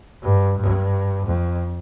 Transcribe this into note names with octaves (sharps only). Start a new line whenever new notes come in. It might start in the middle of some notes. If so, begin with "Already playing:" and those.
G2
G2
F2